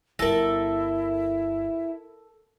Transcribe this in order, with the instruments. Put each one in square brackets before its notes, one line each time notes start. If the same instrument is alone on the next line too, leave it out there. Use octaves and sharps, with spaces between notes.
[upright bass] G1 G3 [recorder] E4 [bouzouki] A4 [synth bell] A#4 A#6